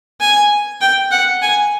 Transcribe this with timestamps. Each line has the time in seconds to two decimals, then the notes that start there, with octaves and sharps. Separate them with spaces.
0.21 G#5
0.81 G5
1.11 F#5
1.42 G#5